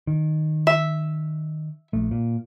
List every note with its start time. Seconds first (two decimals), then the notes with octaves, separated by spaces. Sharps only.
0.07 D#3
0.67 E5
1.93 A#1 A3
2.11 A#2